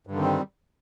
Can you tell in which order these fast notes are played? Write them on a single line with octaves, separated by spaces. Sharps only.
G2 D3 D#3 C4 G3